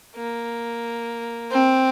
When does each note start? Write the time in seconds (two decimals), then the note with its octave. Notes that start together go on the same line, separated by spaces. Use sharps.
0.15 A#3
1.51 C4